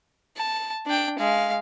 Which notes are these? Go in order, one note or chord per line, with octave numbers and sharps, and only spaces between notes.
A5
D4 G5
G#3 F5